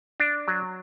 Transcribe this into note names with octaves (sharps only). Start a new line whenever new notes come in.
D4
F#3